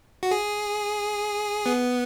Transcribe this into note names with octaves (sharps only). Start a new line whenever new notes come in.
F#4
G#4
B3